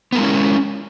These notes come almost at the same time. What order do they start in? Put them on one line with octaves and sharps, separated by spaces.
B3 A#4 G#3 E4 C#4